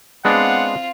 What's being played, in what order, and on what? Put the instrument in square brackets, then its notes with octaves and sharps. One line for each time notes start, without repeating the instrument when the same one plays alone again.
[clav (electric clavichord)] G#3 B3 D4 [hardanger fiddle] C4 F4 [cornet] F#5